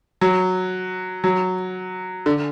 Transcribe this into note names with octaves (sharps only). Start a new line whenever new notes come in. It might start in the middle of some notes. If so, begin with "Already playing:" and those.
F#3
F#3
D3